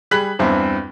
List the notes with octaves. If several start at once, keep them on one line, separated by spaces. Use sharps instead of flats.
G3 G#4 B5 F#6 B6 F#7
E2 G2 C4 E4 C6